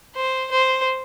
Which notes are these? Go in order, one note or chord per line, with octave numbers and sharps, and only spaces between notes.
C5
C5